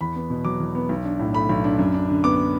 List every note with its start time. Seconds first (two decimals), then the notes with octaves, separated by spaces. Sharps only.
0.01 E2 B5
0.15 B3
0.30 B2
0.45 F#3 D6
0.60 E2
0.75 B3
0.89 B1
1.04 D4
1.19 A2
1.34 A3 B5
1.49 B1
1.64 D4
1.79 F#2
1.94 D4
2.09 D3
2.24 B3 D6